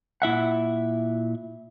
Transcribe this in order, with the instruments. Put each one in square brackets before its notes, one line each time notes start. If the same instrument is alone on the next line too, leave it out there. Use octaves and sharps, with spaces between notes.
[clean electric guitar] A#2 E4 E5 F#5